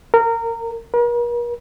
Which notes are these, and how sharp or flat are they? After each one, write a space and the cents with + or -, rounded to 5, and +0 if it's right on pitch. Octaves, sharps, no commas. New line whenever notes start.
A#4 -20
A#4 +45